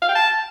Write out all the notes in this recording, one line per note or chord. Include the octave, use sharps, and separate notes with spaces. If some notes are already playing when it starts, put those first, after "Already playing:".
F5
G5
A5